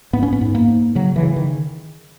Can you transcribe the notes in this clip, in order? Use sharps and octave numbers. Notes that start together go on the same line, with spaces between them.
G#2 B3
C#4
B3
G#2
A#3
G#2
C#3 F#3
E3
C#3
D#3